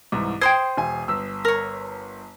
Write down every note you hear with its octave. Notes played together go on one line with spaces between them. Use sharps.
C2 G#2 E3
C5 G5 C6 D#6 G#6 C7
E1 G#5
G1 E6
A#4 C#5